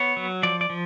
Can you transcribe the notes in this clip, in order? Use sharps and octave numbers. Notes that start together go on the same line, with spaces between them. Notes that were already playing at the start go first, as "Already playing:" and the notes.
Already playing: B3 C#5
F#3
F3 D5
D5
F3